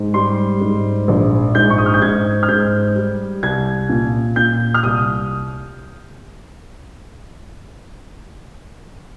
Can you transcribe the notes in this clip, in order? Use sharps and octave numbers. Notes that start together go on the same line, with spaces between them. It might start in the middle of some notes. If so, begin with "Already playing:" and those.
Already playing: G#2
G3 C6
G#2
A#1
G#2 G6
C#6
D#6
F6
G6
G#2 G#6
F6
G#2 G6
G3
C2 G#6
A#2
A#2 G6
F6
C2 D#6